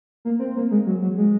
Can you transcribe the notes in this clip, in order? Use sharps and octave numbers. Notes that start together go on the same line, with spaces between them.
A#3
C4
A#3
G#3
F#3
F#3
G#3